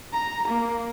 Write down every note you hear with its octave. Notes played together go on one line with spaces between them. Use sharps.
A#5
A#3